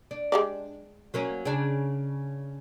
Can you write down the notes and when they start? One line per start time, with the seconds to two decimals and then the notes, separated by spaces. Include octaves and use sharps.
0.11 D4
0.32 G#3 G4 D5
1.14 F#3 A#3 C#4
1.45 C#3 D4